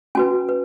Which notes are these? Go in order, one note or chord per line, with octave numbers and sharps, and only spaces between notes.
C#4 F#4 B4 G#5
B4